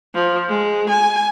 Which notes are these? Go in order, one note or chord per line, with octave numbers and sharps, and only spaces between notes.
F3
G#3
G#5